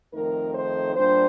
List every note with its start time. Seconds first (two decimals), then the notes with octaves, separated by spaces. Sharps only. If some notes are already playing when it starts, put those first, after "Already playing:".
0.13 F2 D#3 A3 D#4 A#4
0.54 C5
0.95 A#2 G3 D4 C5